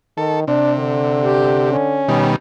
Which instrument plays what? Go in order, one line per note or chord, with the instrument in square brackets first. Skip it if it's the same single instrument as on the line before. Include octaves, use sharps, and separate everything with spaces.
[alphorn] D#3 [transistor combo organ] A4
[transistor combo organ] C3 [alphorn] D4
[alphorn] D3
[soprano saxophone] G4
C#4
[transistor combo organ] B2 D#3 G3